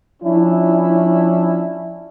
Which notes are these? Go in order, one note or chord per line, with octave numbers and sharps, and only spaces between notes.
F3 C#4 D4 E4